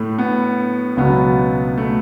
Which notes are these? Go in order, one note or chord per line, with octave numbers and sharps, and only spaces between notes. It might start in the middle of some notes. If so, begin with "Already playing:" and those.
Already playing: A2 A3
B3
C#2 B2 F#3 B3
A3